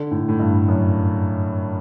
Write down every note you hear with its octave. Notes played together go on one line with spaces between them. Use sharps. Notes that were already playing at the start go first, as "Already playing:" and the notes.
Already playing: D3
A2
A2
G2
F#2